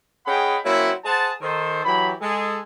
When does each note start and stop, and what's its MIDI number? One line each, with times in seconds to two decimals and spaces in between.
0.26 0.58 61
0.26 0.58 68
0.26 0.58 75
0.26 0.58 78
0.26 0.58 79
0.26 0.58 83
0.64 0.92 54
0.64 0.92 58
0.64 0.92 60
0.64 0.92 61
0.64 0.92 64
1.04 1.32 68
1.04 1.32 72
1.04 1.32 78
1.04 1.32 81
1.42 1.83 51
1.42 1.83 69
1.42 1.83 72
1.84 2.12 52
1.84 2.12 54
1.84 2.12 67
1.84 2.12 83
2.21 2.59 56
2.21 2.59 68
2.21 2.59 69